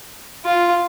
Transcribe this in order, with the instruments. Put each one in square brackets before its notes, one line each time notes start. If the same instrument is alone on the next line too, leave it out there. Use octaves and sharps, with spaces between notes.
[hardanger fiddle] F4